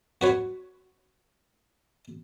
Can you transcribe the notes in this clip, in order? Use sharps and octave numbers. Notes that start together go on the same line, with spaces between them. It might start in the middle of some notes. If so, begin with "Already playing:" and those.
F#4 B4 C#5